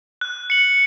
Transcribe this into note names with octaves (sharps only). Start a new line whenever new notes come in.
F#6
C#7 F#7